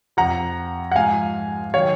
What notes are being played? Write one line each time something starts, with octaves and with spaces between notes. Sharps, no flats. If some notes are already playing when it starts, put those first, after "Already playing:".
F2 F3 F#5 A#5
F#5
G#2 F3 F5 G#5
D#3 F#3 C#5 F5